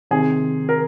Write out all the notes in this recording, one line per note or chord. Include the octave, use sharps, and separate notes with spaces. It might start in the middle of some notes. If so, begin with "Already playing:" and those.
C3 D#3 C4 G#4
A#4